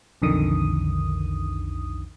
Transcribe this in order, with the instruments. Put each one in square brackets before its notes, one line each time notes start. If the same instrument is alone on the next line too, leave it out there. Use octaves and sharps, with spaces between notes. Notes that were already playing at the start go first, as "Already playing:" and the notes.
[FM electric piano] B1 F2 D3 D#3 D#6